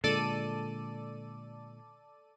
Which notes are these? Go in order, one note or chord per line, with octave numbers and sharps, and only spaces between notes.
A#2 D3 G#3 A4 D5 D#7